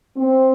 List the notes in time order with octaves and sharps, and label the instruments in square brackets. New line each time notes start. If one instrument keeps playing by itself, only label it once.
[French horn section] C4